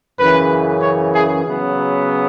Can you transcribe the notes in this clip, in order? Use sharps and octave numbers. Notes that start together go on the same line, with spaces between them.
F#2 C#3 E3 B4
C#5
G#4
C#3 F#3 B3